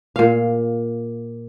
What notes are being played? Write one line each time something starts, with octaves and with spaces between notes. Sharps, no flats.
A#2 F5